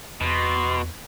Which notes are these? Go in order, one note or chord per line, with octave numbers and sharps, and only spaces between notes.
E2 B2 C6